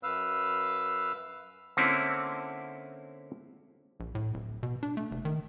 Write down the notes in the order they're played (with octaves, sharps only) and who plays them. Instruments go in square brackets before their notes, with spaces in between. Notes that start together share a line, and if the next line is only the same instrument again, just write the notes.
[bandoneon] F#2 B4 F5 E6
[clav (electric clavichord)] D3 A#3 C4 C#4 E4
[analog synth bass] A#1
A2
D1
B2
D4
A3
F1
D#3